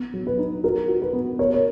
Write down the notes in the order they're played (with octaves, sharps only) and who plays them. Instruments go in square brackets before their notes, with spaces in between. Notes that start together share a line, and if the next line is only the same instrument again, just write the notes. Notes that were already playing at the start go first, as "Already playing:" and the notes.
Already playing: [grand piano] B3
F#3
[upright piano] B4
[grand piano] D#4
[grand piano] F#4 [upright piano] A#4
[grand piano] F#4
[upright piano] B4
[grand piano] B3
[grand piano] A#4 [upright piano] C#5
[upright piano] C#5